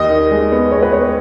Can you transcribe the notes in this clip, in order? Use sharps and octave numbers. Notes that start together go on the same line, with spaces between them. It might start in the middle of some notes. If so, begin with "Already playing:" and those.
Already playing: D#2 D#5
D#3
G#3
B3
G#3 C#5
B4
B3 C#5